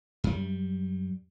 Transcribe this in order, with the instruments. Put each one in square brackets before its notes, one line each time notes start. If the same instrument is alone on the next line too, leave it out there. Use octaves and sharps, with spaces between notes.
[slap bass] F#2 G3